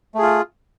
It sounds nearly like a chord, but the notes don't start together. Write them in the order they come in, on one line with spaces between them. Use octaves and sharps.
A3 G#4 F4